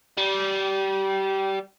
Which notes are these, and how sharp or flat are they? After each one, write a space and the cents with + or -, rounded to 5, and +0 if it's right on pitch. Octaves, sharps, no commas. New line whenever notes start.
G3 -20